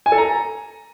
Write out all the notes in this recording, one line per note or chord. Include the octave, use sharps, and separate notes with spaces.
G#5
A4
A#5